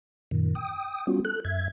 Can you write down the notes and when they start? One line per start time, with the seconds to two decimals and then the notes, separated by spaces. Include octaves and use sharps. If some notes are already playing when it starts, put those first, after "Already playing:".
0.31 F#2 A#2 D#3
0.55 G5 D#6
1.07 G3 B3 C#4 F4 F#4
1.25 A4 F#6
1.45 F#2 E5 G#6